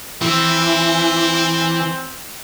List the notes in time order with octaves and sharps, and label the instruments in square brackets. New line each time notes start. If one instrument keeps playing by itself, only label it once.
[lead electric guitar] E3 [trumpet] C4